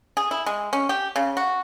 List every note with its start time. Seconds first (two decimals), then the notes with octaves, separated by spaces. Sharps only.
0.17 G#4
0.31 E4
0.46 G#3
0.73 C#4
0.89 G4
1.16 C#3
1.37 F#4